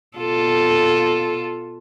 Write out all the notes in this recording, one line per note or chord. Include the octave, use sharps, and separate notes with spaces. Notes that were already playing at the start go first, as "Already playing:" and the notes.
B2 F4 A4